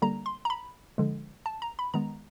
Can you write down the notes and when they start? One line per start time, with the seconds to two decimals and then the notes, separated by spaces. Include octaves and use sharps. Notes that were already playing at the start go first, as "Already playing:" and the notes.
0.02 D3 G3 A#3 A#5
0.26 C6
0.45 A#5
0.50 B5
0.98 D3 F3 G#3
1.46 A5
1.62 A#5
1.79 B5
1.94 D#3 G#3 B3 A#5